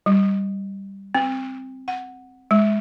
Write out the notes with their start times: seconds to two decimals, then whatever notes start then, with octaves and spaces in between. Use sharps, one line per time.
0.06 G3
1.15 C4
1.88 F#5
2.51 G#3